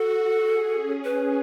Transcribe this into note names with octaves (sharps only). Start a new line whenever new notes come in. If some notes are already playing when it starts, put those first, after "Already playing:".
Already playing: F#4 A4
G#4
C#4
B4